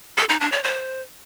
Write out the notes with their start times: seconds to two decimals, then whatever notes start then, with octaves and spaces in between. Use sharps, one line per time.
0.17 A4
0.29 D#4
0.40 D4
0.52 C#5
0.63 C5